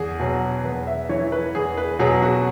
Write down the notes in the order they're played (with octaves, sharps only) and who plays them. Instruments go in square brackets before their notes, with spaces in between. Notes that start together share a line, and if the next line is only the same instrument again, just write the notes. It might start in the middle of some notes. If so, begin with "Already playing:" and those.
Already playing: [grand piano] E2 G#4
B2 F#3
E2 B4
E5
E3 C#5
B4
E2 G#4
B4
B2 F#3 G#4
F#4